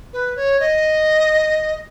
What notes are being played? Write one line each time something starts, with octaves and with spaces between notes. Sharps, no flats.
B4
C#5
D#5